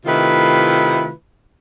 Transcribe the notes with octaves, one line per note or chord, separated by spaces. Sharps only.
C3 D#3 A3 E4 F4 B4